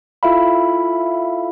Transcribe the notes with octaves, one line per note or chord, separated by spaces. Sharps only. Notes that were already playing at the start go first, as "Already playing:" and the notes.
E4 F4 A4 E5 F5 B5